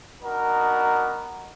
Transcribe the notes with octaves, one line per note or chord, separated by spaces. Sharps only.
B3 D4 D#4 F#4 A#4